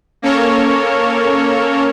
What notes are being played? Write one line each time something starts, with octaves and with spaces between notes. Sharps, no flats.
A#3 C#4 A4 A#4 C#5